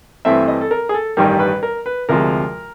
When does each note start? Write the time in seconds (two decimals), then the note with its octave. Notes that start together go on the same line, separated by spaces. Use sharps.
0.25 G2 E3 A3 C4 E5
0.48 D#5
0.61 A4
0.71 A#4
0.89 G#4
0.94 A4
1.17 A1 G2 D#3 G3 A#4
1.40 B4
1.63 A#4
1.86 B4
2.09 D2 C3 F3 G#3 A#4